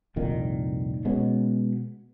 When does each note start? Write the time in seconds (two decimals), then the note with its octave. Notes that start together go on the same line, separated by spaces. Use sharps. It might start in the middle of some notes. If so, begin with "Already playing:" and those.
0.16 C2 F2 A#2 D#3
1.05 B2 G#3 B3 C#4